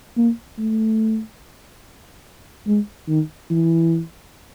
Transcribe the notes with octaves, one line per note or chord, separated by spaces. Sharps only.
A#3
A3
G#3
D#3
E3